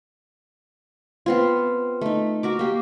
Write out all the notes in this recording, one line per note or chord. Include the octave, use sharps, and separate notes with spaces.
B3 C4 F4
A3 D#4
F#4 A#4 D6
A#3 G4